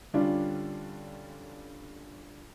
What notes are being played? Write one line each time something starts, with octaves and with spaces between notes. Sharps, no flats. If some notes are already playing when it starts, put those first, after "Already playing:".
D3 G3 C#4 D4 F4